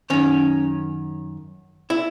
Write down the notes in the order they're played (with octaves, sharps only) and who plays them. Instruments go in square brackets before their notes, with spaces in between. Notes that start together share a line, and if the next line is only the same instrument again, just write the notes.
[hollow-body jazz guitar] F#2 D#3 C#4
E4